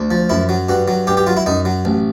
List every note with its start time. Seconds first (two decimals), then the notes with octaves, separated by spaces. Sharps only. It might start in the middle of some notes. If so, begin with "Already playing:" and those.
Already playing: D2
0.11 F3
0.30 F#2 E4
0.49 F#3
0.69 G2 F#4
0.88 F#3
1.07 G2 G4
1.17 G4
1.27 F#3 F4
1.37 E4
1.46 F#2 D#4
1.65 F#3
1.85 A1